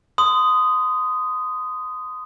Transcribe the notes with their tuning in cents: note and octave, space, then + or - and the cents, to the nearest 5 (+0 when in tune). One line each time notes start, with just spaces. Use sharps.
C6 -30 D#6 +0